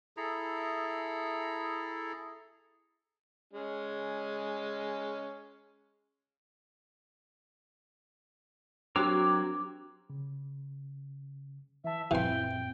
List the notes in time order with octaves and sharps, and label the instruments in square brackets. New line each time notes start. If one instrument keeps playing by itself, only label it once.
[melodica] E4 G#4 A4 A#5
[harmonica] G#3 C#4
[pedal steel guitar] F#3 C4 A#4 [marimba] D4 F#4 G4 [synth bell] D6
[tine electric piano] C#3
[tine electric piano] E3 A5 [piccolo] E5
[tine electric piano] F#2 A#2 C4 [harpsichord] E3 C6 [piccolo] G5